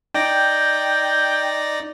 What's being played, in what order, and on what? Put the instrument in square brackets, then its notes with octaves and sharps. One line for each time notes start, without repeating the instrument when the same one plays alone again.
[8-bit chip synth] D#4 D5 A#6 [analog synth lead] G5